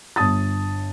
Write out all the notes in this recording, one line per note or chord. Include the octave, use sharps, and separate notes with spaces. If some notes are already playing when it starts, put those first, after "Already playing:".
G1 A5 D#6 A6